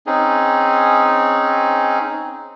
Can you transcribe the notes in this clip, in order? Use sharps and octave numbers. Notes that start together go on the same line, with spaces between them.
C4 C#4 D#4 G#4